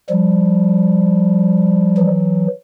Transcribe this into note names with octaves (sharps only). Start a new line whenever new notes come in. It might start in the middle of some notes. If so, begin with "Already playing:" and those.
F3 G3
E3 F#3